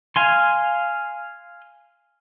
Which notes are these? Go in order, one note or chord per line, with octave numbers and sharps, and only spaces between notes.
F5 G#5 C6